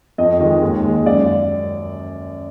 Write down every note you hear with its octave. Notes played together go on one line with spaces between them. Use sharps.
F2 D#5
D#3 G#3
D#2
D#3 G#3
F#2 D5